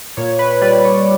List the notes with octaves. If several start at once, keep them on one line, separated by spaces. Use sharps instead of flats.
A#2 C#5
B4
G3 B4 D5
C#5